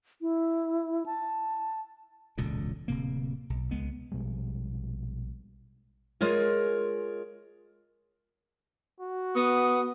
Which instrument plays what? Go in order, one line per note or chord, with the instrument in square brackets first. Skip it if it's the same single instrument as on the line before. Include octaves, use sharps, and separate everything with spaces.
[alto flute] E4
A5
[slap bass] E1 C#2 A#2 D3
D1 C3 A#3
B1
C#2 G#3 B3
[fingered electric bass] A#1 B2 G3 G#3
[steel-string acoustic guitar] G#3 F4 G#4 A#4 C#5
[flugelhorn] F#4
[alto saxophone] B3 [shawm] D#6